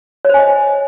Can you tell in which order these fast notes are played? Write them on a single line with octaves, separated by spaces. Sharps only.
C#5 C5 G#5 D#5